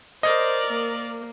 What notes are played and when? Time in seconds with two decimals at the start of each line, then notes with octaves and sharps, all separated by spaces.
0.23 A#4 C5 D5 D#5
0.67 A#3